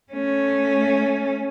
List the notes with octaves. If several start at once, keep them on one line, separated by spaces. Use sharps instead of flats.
A3 C#4